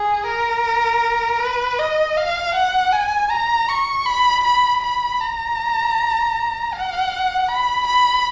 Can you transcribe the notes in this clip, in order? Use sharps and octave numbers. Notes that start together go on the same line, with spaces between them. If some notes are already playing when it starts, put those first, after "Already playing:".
Already playing: G#4
A#4
B4
D#5
F5
F#5
G#5
A#5
C#6
B5
B5
B5
A#5
F#5
B5
B5